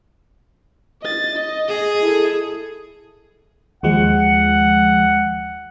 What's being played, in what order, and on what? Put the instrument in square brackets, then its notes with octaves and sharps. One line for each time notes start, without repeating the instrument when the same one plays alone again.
[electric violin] D#5 A6
D#5
[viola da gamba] G#4
[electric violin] E4 A4
[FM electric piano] D#2 F3 G#3 [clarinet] F#5